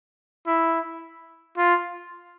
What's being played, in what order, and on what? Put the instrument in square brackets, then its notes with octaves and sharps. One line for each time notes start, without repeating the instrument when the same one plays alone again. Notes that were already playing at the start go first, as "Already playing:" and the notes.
[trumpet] E4
F4